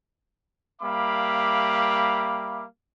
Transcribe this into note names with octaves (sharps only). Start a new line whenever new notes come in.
G3 A#3 E5 F5 B5 D6